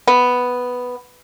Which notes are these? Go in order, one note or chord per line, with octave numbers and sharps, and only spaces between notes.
B3